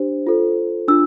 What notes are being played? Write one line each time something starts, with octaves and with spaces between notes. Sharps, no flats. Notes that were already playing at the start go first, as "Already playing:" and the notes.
Already playing: D4 G4 C5
F4 A4 C5
D4 F4 E6